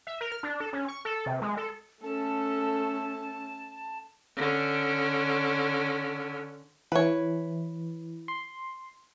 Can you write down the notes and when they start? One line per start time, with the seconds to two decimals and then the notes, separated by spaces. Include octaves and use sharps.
0.07 E5
0.21 A#4
0.32 F6
0.43 D4
0.60 A4
0.73 C#4
0.88 C#6
1.05 A4
1.26 C3
1.42 G#3
1.57 A4
2.04 A3 C#4 A4 A5
4.36 D3 C#4
6.92 E3 B4 C#5
8.28 C6